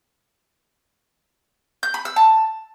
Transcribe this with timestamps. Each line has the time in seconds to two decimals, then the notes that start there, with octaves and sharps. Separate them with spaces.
1.83 G6
1.94 B5
2.05 E6
2.16 A5